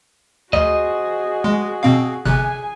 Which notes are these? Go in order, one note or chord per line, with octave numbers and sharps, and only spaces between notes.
D2 F#4 G#4 C5 D#5
G#3
B2 C4 F5
G1 C3 G#4 G#5 F#6